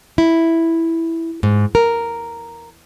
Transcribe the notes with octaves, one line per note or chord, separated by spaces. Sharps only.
E4
G#2
A#4